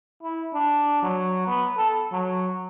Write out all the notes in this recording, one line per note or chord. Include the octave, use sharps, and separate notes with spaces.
E4
D4
F#3
B3
A4
F#3